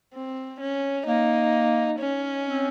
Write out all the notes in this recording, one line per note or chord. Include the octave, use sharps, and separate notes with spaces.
C4
C#4
A#3 D#4
C#4
C4